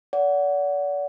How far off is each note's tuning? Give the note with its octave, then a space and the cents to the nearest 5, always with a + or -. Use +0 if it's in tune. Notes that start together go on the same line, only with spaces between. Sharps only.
D5 -40 F#5 +0